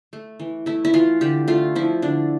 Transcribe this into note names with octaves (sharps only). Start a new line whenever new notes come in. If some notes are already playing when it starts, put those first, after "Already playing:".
A3
E3
A3 E4
E4
E3 F4
D3 G4
A3 F4
F3 E4
D3 D4